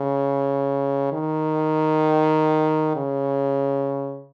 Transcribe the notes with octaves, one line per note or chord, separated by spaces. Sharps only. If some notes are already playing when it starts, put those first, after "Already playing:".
Already playing: C#3
D#3
C#3